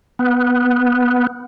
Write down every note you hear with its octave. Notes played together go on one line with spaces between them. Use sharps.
B3